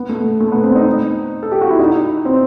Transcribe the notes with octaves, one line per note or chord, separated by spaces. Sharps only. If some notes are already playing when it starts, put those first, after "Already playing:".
Already playing: B3
A3
A3
B3
C4
D#4
A4
G4
F#4
E4
D#4
C4